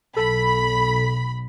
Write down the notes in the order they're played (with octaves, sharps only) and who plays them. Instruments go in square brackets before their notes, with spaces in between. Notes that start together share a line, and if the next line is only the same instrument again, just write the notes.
[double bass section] B1 [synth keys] A4 [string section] B5